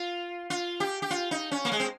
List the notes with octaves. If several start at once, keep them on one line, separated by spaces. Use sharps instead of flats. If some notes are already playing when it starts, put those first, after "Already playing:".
Already playing: F4
F4
G4
G4
F4
D#4
C#4
A#3
G#3
C4